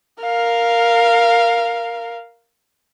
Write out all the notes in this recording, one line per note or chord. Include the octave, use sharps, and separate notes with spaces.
A#4 F5